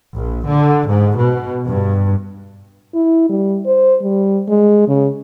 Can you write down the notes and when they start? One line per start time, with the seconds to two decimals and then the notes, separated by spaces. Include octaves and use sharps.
0.14 A#1
0.47 D3
0.88 G#2
1.17 B2
1.67 G2
2.94 E4
3.30 G3
3.66 C5
4.03 G3
4.48 G#3
4.88 C#3